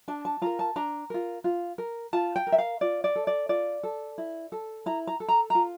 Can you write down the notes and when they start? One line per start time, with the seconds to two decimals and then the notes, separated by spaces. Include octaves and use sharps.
0.08 D4 A5
0.25 A5
0.42 F4 A#4 A#5
0.59 A5
0.76 D4 A#5
1.10 F4 A#4
1.44 F4
1.78 A#4
2.13 F4 A5
2.36 G5
2.47 A#4
2.52 E5
2.58 F5
2.81 F4 D5
3.04 D5
3.16 A4
3.27 D5
3.49 F4 D5
3.83 A4
4.18 E4
4.52 A4
4.86 E4 A#5
5.07 A#5
5.20 A4
5.28 A#5
5.50 F4 A#5